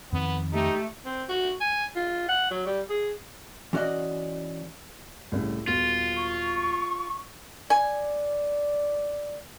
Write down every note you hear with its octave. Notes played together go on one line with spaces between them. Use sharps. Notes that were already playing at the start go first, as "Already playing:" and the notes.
F2 D#3 B3 C4
A3 D#4 G4
C4
F#4
G#5
F4
F#5
F#3
G3
G#4
E3 C#4 F#4 D5 D#5
C2 A2 C#3
D#1 B3 F4 F#4
C#6
D5 G#5